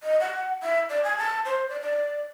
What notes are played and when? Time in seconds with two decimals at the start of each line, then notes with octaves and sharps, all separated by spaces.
0.03 D#5
0.20 F#5
0.62 E5
0.89 D5
1.04 G#5
1.18 A5
1.45 C5
1.69 D5
1.81 D5